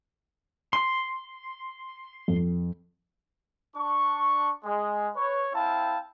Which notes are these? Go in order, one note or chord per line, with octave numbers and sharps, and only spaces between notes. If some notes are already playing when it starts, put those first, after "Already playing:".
C6
F2
D4 C#6
G#3
B4 C#5
C4 E4 F5 G5 A5